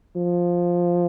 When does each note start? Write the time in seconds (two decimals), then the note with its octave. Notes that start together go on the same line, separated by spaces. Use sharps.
0.16 F3